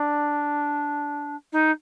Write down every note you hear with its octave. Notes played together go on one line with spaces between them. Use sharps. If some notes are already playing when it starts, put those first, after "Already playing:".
Already playing: D4
D#4